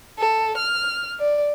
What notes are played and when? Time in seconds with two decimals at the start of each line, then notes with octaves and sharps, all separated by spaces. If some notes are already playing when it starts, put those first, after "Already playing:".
0.19 A4
0.58 F6
1.20 D5